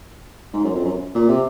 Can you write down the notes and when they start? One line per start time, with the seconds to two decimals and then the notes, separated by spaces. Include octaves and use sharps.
0.53 G#2
0.64 F#2
0.74 F2
0.84 F#2
1.15 A#2
1.28 C3